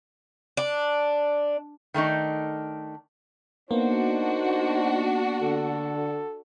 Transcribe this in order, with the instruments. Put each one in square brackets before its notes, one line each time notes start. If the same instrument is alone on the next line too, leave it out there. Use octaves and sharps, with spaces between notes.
[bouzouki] D4
[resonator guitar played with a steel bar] D#3 A3 D4 D#4
[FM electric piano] A#3 B3 [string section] D4 F#4 [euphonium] D#4 [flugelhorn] C5
[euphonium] D3 [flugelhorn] A4